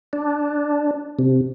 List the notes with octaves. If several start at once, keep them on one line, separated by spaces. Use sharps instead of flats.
D4
C3